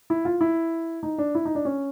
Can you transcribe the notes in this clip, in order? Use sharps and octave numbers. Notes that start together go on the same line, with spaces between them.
E4
F4
E4
D#4
D4
E4
D#4
D4
C#4